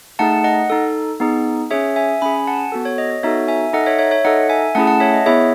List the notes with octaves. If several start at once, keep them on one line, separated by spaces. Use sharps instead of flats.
A3 D#4 G#4 F#5 A5
D#5 F#5
D#4 A4
B3 D#4 G#4
C#4 G#4 C#5 E5
E5 G#5
C#4 G#4 G#5 B5
G#5
F#5 A5
B3 F#4 A4
C#5
D#5
C#5
B3 D#4 F#4 A4 C#5 E5
E5 G#5
D#4 A4 D#5 F#5
C#5 E5
C#5 E5
C#5 E5
D#4 A4 D#5 F#5
E5 G#5
A3 C#4 E4 G#4 F#5 A5
F#5 A5
C#5 E5
D#5
B3 E4 G#4 C#5 E5